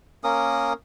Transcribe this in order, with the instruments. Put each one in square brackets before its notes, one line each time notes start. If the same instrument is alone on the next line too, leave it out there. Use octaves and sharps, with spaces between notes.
[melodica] A#3 C#4 A#4 D#6